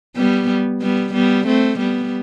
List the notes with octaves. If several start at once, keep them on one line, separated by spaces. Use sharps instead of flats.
G3 B3
G3 B3
G3 B3
A3 C4
G3 B3